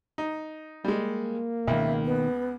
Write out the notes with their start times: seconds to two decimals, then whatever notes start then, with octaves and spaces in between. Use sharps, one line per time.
0.18 D#4
0.85 G3 G#3 A#3
1.68 C#2 B2 D#3 E5
2.05 B3